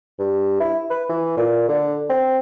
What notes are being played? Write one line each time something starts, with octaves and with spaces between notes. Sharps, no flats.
G2
E4
B4
E3
A#2
D3
C4